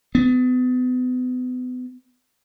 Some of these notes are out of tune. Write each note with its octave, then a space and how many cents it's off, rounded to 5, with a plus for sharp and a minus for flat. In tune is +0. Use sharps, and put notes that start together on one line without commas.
B3 +35